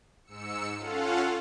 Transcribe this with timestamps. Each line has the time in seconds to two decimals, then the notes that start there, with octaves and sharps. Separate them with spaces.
0.25 G#2 E6 C#7
0.78 C#4 F4 A4 F5 F#5